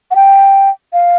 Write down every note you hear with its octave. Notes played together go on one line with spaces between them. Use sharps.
F#5
G5
F5